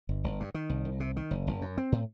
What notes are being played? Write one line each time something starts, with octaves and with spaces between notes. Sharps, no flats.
G1
G1
G2
D#3
C2
C2
C3
D#3
F#1
F#1
F#2
C4
A2